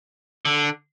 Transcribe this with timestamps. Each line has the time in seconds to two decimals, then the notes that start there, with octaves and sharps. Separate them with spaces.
0.45 D3